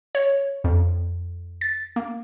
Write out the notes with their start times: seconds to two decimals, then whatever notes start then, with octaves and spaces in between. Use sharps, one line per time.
0.15 C#5
0.64 F2
1.61 A6
1.96 A#3